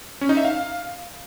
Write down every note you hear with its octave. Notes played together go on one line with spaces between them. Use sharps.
C#4
D#4
E5
F5